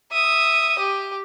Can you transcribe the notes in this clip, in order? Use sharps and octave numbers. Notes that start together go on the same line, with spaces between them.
E5 D#6
G4